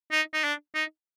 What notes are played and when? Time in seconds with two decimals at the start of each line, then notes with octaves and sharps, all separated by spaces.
0.12 D#4
0.34 D#4
0.44 D4
0.75 D#4